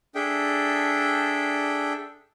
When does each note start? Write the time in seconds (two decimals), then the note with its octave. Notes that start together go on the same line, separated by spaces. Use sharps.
0.15 D4 G#4 A4 E5 G5